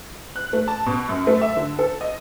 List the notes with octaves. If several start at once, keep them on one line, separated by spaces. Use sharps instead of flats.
F#6
A3
A5
B2
F#2
A3
E5
D3
A4
D#5